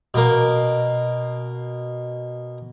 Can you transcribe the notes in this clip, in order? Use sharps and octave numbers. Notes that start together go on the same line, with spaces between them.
B2 A#3